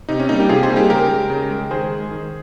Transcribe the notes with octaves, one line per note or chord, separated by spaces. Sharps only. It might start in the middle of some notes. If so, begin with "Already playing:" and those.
C3 D#4
C#4
G3 A#3 D#4
D#4 G4
C3 F4 G#4
G#4 C5
G3 A#3
D#4 G4
C#3 G4 A#4
G#3
C#3
G#3
D#3 G#4 C5
G#3
D#3